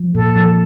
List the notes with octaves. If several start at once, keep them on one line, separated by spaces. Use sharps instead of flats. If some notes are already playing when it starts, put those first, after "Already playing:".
Already playing: F3
A#2 A4
F3